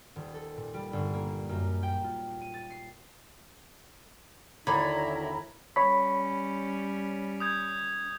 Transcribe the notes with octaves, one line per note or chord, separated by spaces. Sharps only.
D#1
A4
A#2
G3
G1
A#3
F#2
G5
F4
D#7
A6
C7
D#2 D3 F#3 E4 A#4 A#5 B5 G#6
G3 C#4 C#5 B5
D#6 G6 G#6